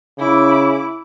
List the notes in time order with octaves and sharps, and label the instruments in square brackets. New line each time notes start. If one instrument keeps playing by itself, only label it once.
[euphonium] C#3 [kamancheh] E4 D6